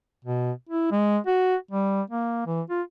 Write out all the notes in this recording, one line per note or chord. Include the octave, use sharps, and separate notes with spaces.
B2
E4
G#3
F#4
G3
A#3
E3
F4